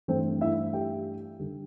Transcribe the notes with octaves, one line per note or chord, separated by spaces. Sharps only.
G2 E3 A3 C4 C5
E4 E5
G4 G5
D3 G3